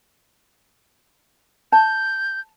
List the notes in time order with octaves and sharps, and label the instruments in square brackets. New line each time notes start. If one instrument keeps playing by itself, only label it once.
[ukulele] A5 [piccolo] G6